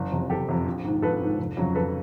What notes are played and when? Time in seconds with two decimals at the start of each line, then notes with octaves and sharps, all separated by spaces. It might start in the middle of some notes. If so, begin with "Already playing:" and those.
Already playing: F#1
0.12 F2 C3
0.30 F#1 G4 A4
0.49 F2 C3
0.66 A#1
0.85 G#2 D#3
1.02 A#1 A4 B4
1.21 G#2 D#3
1.39 F1
1.57 F2 C#3 F#3
1.75 F1 A4 B4